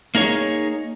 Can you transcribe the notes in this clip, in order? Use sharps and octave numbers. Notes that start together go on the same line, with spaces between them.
A#3 D#4 G#4 C#5